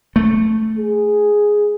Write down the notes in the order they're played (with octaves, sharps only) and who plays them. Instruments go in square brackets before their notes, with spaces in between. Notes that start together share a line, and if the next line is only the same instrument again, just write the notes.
[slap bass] A3
[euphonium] G#4